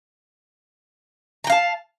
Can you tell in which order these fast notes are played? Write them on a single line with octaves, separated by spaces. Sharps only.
A#5 G5 F5 A5